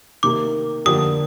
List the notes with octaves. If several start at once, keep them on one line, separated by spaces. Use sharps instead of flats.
C3 D#3 A#3 D6
D3 F3 A#3 D4 G4 D#6